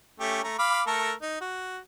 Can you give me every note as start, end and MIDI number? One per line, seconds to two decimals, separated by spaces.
0.20 0.42 57
0.20 0.42 61
0.20 0.42 67
0.44 0.55 57
0.44 0.55 82
0.59 0.82 77
0.59 0.82 83
0.59 0.82 86
0.87 1.12 57
0.87 1.12 69
0.87 1.12 70
1.22 1.41 63
1.41 1.78 66